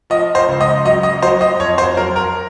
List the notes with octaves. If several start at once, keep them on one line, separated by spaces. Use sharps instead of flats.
F3 D#5
C5
C#2
D#5
F#3 D#5
D#5
F#3 C5
D#5
F2 C#5
C5
F#3 A#4
A#4